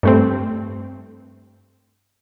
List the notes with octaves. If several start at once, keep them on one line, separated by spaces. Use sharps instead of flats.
G2 A3 C4